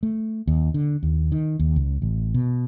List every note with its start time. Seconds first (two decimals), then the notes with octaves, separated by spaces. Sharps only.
0.03 A3
0.47 D#2
0.74 D3
1.03 D#2
1.32 D#3
1.59 D#2
1.76 C#2
2.02 A1
2.34 B2